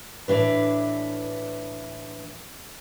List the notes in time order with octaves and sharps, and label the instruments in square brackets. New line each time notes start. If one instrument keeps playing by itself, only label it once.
[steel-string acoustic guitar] A2 E3 D4 B4